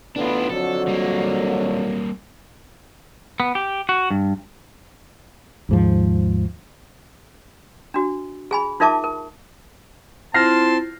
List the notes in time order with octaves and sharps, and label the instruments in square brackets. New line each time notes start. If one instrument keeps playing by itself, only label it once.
[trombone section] A1 A2 B3 [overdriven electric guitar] D4 F4
[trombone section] F2 D3 F#3 [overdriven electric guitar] A4
[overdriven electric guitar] G3 A#3
[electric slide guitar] B3
G4
F#4
G2
[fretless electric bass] D#2 G#2 F3
[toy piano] D4 F#4
G#4 G#5 B5
D#4 F4 A#4 E5 A5 D6
A#4
[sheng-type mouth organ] C4 C6 [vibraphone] E4 F4 [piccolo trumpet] A5 [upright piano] F6 A#6 C7